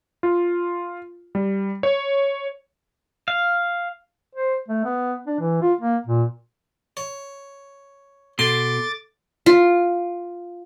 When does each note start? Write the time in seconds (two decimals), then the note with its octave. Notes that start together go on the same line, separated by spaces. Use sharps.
0.23 F4
1.35 G3
1.83 C#5
3.28 F5
4.35 C5
4.68 A3
4.85 B3
5.27 D4
5.40 E3
5.62 F4
5.81 A#3
6.07 A#2
6.97 C#5
8.39 B2 A4 C6 D6 A6
9.46 F4